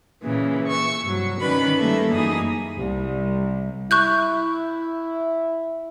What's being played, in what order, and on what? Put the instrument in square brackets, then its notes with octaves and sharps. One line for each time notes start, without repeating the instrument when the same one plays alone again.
[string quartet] A#2 C#3 E3
C#6 E6
G2 C3 F#3
D#3 C#4 B4 D5 B5
G3 A3 A#3 A4 E5
F#2 E3 A#3 D#4 G#4 D#6
[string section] C2
[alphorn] E4 [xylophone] C#6 F#6 G6